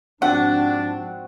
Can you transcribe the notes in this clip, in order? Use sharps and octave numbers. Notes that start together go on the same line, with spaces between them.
G#2 F3 C4 D4 F#4 D5 F#5